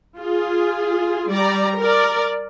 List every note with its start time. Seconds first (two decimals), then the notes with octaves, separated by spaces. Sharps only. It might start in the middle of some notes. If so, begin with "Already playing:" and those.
0.18 F4 G#4
1.30 G3 D5 A#5
1.79 A#4 D5